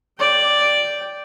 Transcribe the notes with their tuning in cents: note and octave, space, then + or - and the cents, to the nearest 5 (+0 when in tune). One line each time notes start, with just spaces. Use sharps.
D5 +0 G5 +0